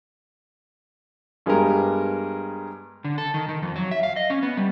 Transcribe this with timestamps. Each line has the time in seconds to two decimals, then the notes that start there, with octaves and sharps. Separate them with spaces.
1.46 G2 G#3 B3 G4 A#4
3.05 D3
3.18 A4
3.34 D#3
3.49 D#3
3.62 F2
3.76 F#3
3.91 E5
4.03 F5
4.16 D#5
4.30 C#4
4.43 B3
4.57 G3